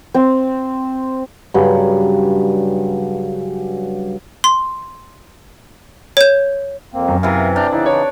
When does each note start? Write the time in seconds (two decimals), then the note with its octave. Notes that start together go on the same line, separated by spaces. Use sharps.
0.14 C4
1.54 G2 C#3 F#3
4.44 C6
6.17 C#5 G6
6.94 F2 A#3 C4
7.08 F#2
7.23 C3 E3 A#4 F5
7.56 D4 A#5 F6 G6
7.72 C#3 E3 D#4 E4
7.86 C#5